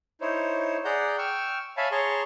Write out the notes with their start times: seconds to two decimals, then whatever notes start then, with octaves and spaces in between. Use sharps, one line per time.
0.21 D#4 E4 C5 C#5
0.85 G#4 D5 F#5 A#5 G6
1.18 G5 C#6 E6 F6
1.77 C#5 E5 F5 G#5 A5 B5
1.91 G#4 C#5 A5 A#5 C6 C#6